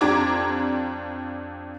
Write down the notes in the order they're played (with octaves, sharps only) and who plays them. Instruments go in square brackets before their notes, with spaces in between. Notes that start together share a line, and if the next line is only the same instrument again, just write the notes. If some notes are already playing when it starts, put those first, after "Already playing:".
[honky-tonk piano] F2 D4 G4 A#5 D6 G#6